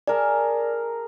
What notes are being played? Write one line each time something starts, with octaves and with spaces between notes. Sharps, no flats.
G#4 A#4 D5 A5